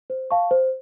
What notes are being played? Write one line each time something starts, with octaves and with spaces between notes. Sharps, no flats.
C5
F5 A5 C#6
C5